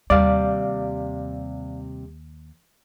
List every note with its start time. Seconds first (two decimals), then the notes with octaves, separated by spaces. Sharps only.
0.10 D#2 C3 G3 D5 F5